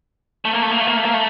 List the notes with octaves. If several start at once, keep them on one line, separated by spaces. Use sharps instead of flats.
A3
A#3
A3
A#3
A3
A#3
A3
A#3
A3